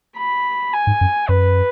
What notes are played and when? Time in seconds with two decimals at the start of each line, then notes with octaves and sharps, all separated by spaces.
0.17 B5
0.74 G#5
0.87 G#2
1.01 F#2
1.28 F#2 B4